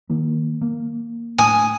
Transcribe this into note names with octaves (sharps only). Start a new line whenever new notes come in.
D#3 A#3
A#3
A2 A3 D4 G#5 D#6